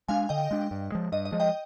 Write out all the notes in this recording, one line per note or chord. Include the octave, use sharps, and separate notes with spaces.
G#3 D4 F5 G#5
D3 D#5 G5
G#3 D4
G2
F3 G#3
G2 D#5
D#5
F3 G#3
D#5 G5